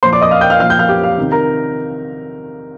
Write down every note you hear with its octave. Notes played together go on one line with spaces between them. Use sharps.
A#2 F3 C5 C6
D5 D6
D#5 D#6
F5 F6
G5 G6
F5 F6
A#2 F3 F5 F6
G5 G6
F5 F6
G4 G5
F5
C3 D#3
A#4 A#5